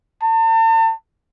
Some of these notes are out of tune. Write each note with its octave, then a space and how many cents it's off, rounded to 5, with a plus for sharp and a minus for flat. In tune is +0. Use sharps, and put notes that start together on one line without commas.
A5 +40